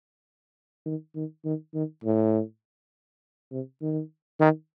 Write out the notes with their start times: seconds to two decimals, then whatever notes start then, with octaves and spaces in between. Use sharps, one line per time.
0.86 D#3
1.15 D#3
1.45 D#3
1.75 D#3
2.04 A2
3.51 C3
3.82 D#3
4.40 D#3